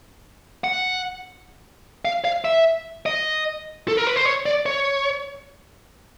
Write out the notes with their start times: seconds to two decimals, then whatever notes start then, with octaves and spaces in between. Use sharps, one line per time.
0.64 F#5
2.05 F5
2.25 F5
2.45 E5
3.06 D#5
3.88 A4
3.97 A#4
4.07 B4
4.16 C5
4.26 C#5
4.46 D5
4.66 C#5